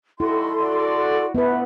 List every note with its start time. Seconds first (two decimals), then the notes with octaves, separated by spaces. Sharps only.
0.20 G3 D#4 E4 F#4 A4 C6
0.60 F#4 D5
1.35 D3 F3 A3 B3 B4 E5